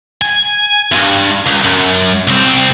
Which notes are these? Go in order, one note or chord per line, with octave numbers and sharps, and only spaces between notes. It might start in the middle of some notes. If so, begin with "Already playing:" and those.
G#5
E2 G2
C#2
F#2
C2 C4